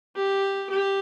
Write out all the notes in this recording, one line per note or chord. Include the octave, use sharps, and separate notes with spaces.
G4
G4